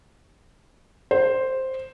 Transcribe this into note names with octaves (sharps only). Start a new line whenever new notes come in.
C5